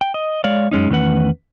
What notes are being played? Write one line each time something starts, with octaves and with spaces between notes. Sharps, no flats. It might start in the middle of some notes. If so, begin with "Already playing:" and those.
G5
D#5
G#3 C#5 D5 F5
F#2 G#3 C#4 D#4
E2 D#3 A3 C#4 B4 F#5